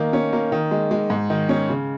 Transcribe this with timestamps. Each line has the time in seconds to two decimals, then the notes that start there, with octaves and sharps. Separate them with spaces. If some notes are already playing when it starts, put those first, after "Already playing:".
Already playing: D#3 A#3
0.13 C#4
0.33 A#3
0.52 D#3
0.71 G#3
0.91 G#3
1.10 G#2
1.30 D#3
1.49 C#4
1.69 C#3